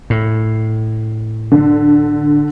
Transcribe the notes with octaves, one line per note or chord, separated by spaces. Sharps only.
A2
D3